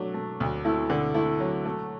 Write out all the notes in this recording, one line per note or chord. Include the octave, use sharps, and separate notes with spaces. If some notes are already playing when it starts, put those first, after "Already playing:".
Already playing: F#3 A3 D4
A3
D2
A3 E4
D3
A3 E4
F#3
A3